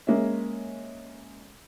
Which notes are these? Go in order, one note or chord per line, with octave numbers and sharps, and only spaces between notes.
G#3 A#3 C#4 E5